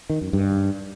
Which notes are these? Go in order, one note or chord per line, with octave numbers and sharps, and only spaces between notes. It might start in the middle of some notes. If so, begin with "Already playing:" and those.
D#3
F#2
G2